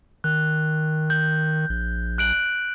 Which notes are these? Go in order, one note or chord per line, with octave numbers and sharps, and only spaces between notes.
D#3 F#6
G6
A#1
F#6 D7 F#7